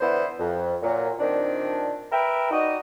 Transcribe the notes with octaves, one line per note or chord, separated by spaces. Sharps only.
D3 E3 B3 E4 C5
F2
A#2 F#3
A#2 D#3 C4 D4
A#4 B4 E5 G5
D#4 F#4 D5 D#5